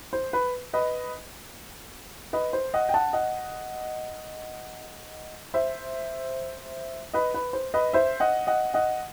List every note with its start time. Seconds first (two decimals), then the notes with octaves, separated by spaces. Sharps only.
0.13 C5
0.33 B4
0.74 B4 D#5
2.33 B4 D#5
2.53 C5
2.74 D#5 F#5
2.89 G5
2.94 F#5 A5
3.13 D#5 F#5
5.54 C5 E5
7.14 B4 D#5
7.34 B4
7.53 C5
7.74 B4 D#5
7.93 C5 E5
8.20 D#5 F#5
8.47 D#5 F#5
8.74 D#5 F#5